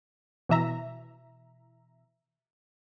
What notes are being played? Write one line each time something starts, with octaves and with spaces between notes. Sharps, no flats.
B2 E3 E5 A#5